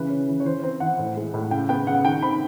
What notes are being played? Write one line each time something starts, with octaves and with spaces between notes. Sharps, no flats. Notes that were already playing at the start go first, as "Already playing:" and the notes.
Already playing: C#3 E3 B4
C#4
E3
C#5
E3 C5
C4 C5
E3 F#5
A2
G#3
A2
C#3 G5
B3 G5
C#3 F#5
D#3 G5
C4 B5